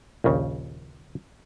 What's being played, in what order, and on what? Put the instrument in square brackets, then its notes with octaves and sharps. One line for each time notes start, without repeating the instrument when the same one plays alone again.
[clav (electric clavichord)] A#1 D#2 C#3